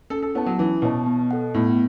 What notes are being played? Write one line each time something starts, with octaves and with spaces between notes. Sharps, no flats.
C#4 A4
A4
B3 E4 C#5 A5
F#3
E3 C#4
B2 E4 C#5 A5
B3
A4 F#5
A2 B3